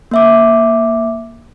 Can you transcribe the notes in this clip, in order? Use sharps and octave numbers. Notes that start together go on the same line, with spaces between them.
A#3 E5 D6